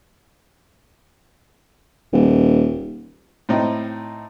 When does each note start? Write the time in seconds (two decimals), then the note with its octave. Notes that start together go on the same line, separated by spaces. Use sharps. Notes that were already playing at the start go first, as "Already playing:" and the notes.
2.13 D#1
3.49 A2 C4 D#4